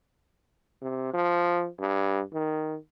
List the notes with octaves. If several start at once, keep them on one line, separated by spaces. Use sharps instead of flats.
C3
F3
G2
D#3